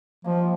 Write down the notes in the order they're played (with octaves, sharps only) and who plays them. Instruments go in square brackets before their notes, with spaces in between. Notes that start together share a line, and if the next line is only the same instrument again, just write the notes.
[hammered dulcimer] D#3 G3 A#3 [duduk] F3